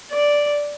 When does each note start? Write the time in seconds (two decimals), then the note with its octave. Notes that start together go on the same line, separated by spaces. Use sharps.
0.11 D5